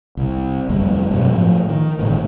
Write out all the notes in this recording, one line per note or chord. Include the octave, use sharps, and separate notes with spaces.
C2
G1 F2 G3 A3
G2 B2 F#3
A2 F3
D#3
G1 A2 D#3